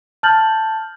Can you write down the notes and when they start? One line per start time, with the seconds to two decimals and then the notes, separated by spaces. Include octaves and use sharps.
0.23 A5 F6 G6 A6 F#7